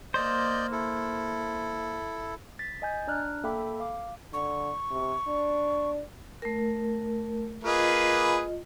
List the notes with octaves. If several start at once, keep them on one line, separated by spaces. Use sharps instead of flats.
A#3 C5 D5 D#5 G6
E4 A4
A6 B6
D#5 G#5 G6 A6
D4 D5 A#5 F6 F#6
A#3 A4 E5 G5 B5 D6
F5 D6
D3 C#6
C3
D4
A3 A#4
A#3 F4 G#4 B4 D#5